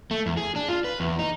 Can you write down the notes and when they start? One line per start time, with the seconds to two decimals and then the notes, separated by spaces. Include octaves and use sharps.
0.11 A3
0.26 E2
0.37 G#4
0.56 D4
0.69 F4
0.84 B4
1.00 E2
1.19 D#4